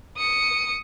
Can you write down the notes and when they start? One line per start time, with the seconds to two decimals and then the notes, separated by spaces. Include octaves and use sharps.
0.17 D#6 C#7